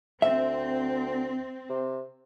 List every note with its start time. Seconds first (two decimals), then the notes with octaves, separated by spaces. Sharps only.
0.22 D2 C4 E5
1.70 C3